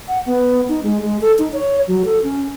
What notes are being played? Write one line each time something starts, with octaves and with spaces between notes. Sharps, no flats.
F#5
B3
D#4
G#3
G#3
A4
D#4
C#5
F#3
A4
C#4